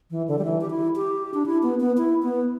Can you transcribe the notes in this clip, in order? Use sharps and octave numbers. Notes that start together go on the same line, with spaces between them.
E3
D3
G3
E3
G4
E4
G4
D4
E4
B3
B3
E4
B3